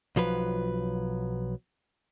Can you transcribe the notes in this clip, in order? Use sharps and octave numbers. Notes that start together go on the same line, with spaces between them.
B1 F3 F#3 B4